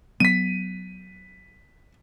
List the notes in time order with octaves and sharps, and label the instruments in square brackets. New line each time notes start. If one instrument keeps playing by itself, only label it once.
[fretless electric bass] F#3 B3 [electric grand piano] B6 D#7